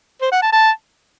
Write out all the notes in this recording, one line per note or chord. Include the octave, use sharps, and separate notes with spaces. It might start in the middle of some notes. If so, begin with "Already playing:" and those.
C5
F#5
A5
A5